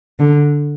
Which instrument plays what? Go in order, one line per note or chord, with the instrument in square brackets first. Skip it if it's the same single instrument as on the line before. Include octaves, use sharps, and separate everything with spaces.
[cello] D3